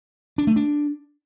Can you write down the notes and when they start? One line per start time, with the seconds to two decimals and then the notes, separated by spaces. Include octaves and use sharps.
0.38 D4
0.47 A3
0.56 D4